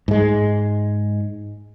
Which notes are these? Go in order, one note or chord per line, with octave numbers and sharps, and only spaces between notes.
G#2 G#3